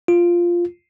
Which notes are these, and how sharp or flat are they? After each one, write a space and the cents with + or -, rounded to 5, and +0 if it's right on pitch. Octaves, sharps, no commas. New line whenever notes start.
F4 -5